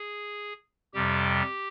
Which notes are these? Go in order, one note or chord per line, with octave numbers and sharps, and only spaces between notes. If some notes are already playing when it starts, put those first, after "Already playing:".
Already playing: G#4
F2 C3 G3 G4